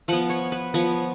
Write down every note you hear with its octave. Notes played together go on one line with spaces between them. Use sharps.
F3 B3 F#5
C#5
B4
F3 B3 C#5